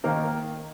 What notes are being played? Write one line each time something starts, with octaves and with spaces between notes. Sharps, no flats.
D#3 A#3 D#4 A#4